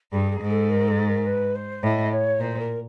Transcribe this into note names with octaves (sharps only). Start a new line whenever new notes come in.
G2 G#4
G#4
G#2
A4
A#4
A4
A#4
B4
C5
A2 D#5
C#5
A#2 C5
A#4